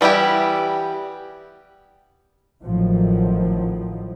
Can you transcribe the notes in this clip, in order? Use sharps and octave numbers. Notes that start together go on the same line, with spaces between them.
E3 G3 B3 E4 G4
A1 A2 D#3 F3 F#3